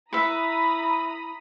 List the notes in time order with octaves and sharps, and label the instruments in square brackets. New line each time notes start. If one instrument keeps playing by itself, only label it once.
[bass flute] E4 [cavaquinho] B4 E5 [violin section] A#5 B5 D#6